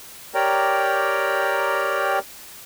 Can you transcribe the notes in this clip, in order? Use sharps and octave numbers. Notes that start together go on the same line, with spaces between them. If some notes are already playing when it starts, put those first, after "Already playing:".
G4 A#4 C#5 D5 G5 A#5